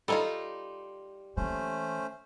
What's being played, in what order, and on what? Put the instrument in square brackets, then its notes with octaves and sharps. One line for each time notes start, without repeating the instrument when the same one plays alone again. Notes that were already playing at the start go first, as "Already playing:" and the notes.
[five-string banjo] G3 D#4 F4 [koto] A4 G#5 A#5
[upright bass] E3 A#3 [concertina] A3 C#4 C5